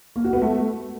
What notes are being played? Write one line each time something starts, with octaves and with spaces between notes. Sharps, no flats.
A#3
F#4
B3
A3